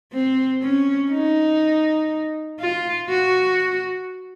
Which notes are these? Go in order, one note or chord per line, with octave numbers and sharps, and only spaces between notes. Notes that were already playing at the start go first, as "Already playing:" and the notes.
C4
C#4
D#4
F4
F#4